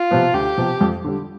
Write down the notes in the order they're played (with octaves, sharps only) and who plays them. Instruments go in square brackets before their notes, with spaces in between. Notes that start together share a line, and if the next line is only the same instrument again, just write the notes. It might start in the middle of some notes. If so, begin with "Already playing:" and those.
Already playing: [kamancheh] F4
[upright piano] C3 F3 B3
[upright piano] D2 [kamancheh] G4
[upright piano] C3 F3 B3
F2
D3 G3